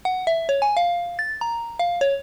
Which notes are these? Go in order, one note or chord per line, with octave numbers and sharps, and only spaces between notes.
F#5
E5
C#5
G#5
F5
A6
A#5
F5
C#5